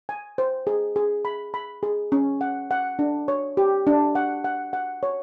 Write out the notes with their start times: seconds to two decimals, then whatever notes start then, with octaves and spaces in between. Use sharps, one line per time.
0.09 G#5
0.38 C5
0.67 G#4
0.96 G#4
1.25 B5
1.54 B5
1.83 G#4
2.12 C#4
2.41 F#5
2.71 F#5
2.99 D4
3.28 C#5
3.57 G4
3.87 D4
4.15 F#5
4.44 F#5
4.73 F#5
5.03 C#5